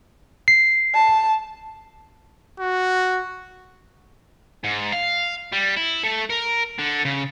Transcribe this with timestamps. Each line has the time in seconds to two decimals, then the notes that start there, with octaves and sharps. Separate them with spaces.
0.48 C7
0.95 A5
2.60 F#4
4.64 G#2
4.93 F5
5.53 G3
5.77 E4
6.04 A3
6.30 A#4
6.79 D3
7.05 C#3